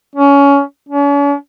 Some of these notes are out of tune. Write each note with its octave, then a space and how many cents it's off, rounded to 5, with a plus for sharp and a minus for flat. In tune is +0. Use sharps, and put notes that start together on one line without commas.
C#4 +20
C#4 +45